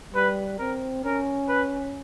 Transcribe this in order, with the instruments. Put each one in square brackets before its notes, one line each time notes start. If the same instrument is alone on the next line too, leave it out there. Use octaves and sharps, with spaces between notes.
[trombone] G3 [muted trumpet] B4
[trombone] C4 [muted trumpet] A#4
[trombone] C#4 [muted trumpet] A#4
[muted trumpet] B4